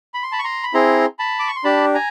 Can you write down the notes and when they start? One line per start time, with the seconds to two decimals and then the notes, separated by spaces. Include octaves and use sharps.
0.14 B5
0.23 C6
0.32 A5 B5
0.39 C#6
0.44 A#5 C6
0.63 B5
0.74 C4 E4 G#4 A#5 C6
1.19 A5 B5
1.39 D6
1.47 C#6
1.56 C6
1.64 D4 G4 A5 B5
1.94 G#5 A#5